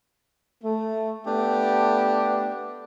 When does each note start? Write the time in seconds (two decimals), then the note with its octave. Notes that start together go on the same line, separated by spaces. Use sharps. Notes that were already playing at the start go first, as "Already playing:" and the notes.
0.63 A3
1.27 A3 B3 D4 G4